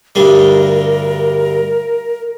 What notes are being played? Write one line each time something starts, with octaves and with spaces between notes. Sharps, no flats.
D2 G2 G3 A#4